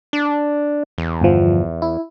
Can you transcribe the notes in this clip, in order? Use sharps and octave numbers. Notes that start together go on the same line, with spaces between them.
D4
E2
G1 F3
E4